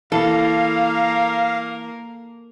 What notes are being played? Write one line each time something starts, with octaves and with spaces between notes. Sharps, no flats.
E3 A#3 A4 A#4 F5